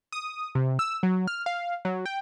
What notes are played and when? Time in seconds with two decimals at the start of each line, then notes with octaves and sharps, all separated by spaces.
0.12 D#6
0.55 C3
0.79 E6
1.03 F#3
1.28 F6
1.46 F5
1.85 F#3
2.06 G5